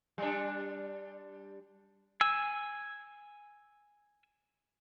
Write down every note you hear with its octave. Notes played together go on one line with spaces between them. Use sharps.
G3 D4
G#5 E6